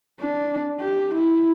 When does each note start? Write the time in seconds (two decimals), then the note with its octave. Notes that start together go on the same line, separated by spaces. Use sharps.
0.20 D4
0.80 G4
1.14 E4